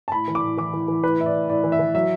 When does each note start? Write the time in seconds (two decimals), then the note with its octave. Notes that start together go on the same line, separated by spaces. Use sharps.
0.08 A5
0.12 A2 B5
0.28 E3
0.35 D6
0.43 A2
0.57 E3 D6
0.73 E3
0.88 E3
1.03 A2 B4
1.19 A2 E5
1.26 D5
1.34 A2
1.49 A2 D5
1.64 E3
1.72 E5
1.79 E3
1.95 F#3 E5